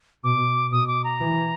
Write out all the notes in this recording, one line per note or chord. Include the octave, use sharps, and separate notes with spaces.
B2 D6
B2 D#6
D6
A#5
E3